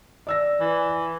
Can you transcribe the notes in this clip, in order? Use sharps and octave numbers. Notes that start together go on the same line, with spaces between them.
D5 E6 A#6
E3